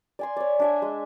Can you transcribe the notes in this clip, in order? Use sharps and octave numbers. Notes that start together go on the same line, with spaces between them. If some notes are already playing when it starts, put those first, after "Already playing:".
D5 G#5 C6
C#5 D5
D4 E5 G#5
G#3